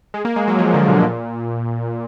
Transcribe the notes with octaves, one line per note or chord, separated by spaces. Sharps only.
G#3
A#3
G#3
F#3
F3
D3
B2
A#2